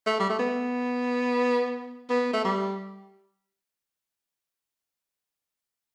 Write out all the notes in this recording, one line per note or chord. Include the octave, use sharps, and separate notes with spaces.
A3
G3
A3
B3
B3
A3
G3